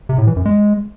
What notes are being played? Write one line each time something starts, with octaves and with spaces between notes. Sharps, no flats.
C3
A2
E3
F#2
G#3